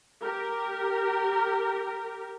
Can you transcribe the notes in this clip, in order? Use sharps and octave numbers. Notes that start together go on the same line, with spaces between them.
G4 A#4